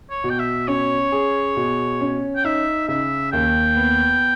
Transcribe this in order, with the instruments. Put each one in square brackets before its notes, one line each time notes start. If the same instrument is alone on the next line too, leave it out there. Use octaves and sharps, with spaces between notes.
[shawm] C#5
[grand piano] B2
[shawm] G5
E5
[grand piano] C#4 [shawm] C#5
[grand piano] G#4
B2
C#4
[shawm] G5
[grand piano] D#4 [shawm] E5
[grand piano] C#3 [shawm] E5
[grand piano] D#2 [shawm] G5
[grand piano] B3